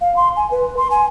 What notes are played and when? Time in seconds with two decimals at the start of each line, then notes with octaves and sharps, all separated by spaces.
0.01 F5
0.16 C6
0.36 G#5
0.51 B4
0.77 C6
0.91 G#5